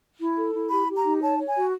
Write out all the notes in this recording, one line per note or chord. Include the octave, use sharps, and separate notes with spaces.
E4
A4
E4
G4 B5
G4
A#5
D#4
C#5 A5
C#5
G#5
F#4